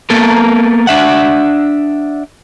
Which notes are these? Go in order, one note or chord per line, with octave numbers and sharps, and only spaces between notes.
A#3 B3 A4 A#4
D4 E5 F#5